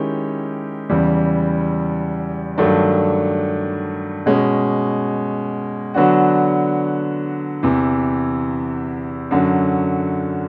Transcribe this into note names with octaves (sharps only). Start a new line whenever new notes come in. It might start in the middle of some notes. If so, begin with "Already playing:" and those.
Already playing: D#3 G#3 C#4 E4 G4
E2 C#3 E3 G3
G2 D#3 F#3 A3 D4
B2 G#3 C#4
D3 F#3 B3 D4 F#4
E2 C3 E3
F#2 D3 F#3